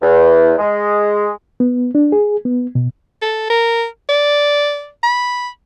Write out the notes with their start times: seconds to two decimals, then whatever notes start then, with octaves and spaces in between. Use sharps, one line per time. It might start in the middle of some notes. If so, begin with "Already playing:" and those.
0.02 E2
0.59 G#3
1.60 B3
1.95 D4
2.12 G#4
2.45 B3
2.75 B2
3.22 A4
3.50 A#4
4.09 D5
5.03 B5